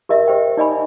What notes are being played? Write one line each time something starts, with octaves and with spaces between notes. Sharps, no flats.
G4 A#4 D#5 E5
G4 C5 G5
D#4 D5 D#5 G#5 B5